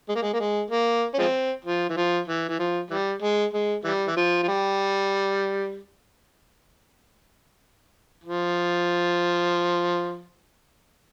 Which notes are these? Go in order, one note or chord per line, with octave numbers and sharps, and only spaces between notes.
G#3
A#3
G#3
A#3
G#3
A#3
C#4
F3 G#3 C4
F3
E3
F3
E3
E3
F3
E3 G3
G#3
G#3
E3 G3
E3
F3
F3
G3
F3